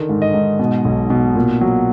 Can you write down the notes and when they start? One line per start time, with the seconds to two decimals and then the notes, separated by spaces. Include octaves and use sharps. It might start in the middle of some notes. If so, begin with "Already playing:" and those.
Already playing: D3 D#3
0.09 G#2
0.22 D#5
0.34 G#2
0.59 B2
0.85 B1
1.10 B2
1.35 A#2
1.61 F#3